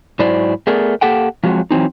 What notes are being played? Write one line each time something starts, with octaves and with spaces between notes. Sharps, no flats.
G#2 F#3 E4 C5 D5
A3 B3 G#4 A#4 D5
A#3 G4 A4 F#5 G5
F3 F#3 G#3 C4 F#4
E3 F#3 C4 D#4